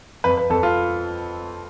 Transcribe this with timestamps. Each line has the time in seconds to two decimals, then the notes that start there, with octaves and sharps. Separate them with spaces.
0.24 F2 B4
0.37 B4
0.50 F2 A4
0.63 F4